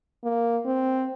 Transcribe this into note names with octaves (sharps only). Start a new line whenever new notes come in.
A#3
C4